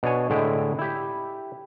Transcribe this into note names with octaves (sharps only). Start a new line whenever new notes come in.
B2 D4 C#5 G#5
A2 D3 G#3 E4 G5
E4 G4